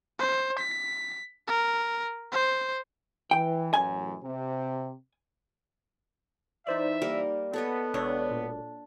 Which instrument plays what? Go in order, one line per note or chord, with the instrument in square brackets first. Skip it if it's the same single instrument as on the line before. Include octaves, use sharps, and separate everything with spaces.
[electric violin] C5
B6
A#4
C5
[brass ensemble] E3 [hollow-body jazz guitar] G5
[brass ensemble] A1 F#2 [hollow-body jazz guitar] G#5
[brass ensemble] C3
[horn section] E3 E5 [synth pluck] D#4 C5 D5
[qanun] G3 A#3 A#4
[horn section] B3 [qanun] A4 C#5 D#5
[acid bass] E1 [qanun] D4 [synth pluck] A4 C#5
[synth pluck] A#2